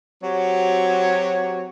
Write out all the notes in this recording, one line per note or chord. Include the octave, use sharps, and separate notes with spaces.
F#3 C4 F#4 G4 C#5